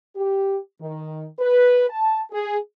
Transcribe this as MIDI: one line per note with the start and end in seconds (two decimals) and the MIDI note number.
0.15 0.57 67
0.80 1.25 51
1.39 1.89 71
1.89 2.20 81
2.31 2.57 68